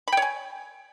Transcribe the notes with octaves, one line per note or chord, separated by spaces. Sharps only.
C#5 G5 G#5 B5